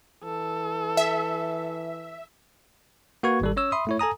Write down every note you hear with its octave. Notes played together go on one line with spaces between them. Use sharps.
E3 A4
E5
A#3 F#4 B4 C#6 G#6
G#1 G3 A4
C#4 C#5 E6
E5 B5 C6 D#6
A3 E4 C#5
A4 G#5 A#5 D#6